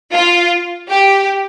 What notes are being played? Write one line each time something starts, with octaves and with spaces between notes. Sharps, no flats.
F4
G4